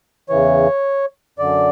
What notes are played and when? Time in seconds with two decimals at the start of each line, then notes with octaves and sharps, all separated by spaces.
0.29 E2 C#3 E3 C#5
1.38 F#2 D3 D5